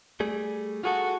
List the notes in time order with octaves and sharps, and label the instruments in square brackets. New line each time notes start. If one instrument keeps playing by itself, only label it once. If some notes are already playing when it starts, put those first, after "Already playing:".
[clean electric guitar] G3 A3 G#4
[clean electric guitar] F4 G#4 A4 [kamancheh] F#4